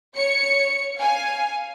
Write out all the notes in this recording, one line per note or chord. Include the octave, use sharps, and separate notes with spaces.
C#5 C#7
F5 G#5